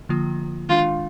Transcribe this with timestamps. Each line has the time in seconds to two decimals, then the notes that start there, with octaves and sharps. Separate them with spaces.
0.09 D3 F3 A#3 F4
0.69 D#3 G#3 D4 F4